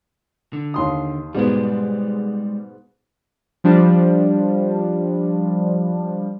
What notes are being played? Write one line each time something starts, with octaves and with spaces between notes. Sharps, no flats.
D3
D#2 C6 D#6
G#2 B2 G3 G#3 B3
F3 G3 D4